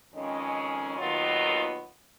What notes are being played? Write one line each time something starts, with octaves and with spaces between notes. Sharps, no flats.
F2 D#3 G#3 C#4
D#2 D#3 F#3 B3 F4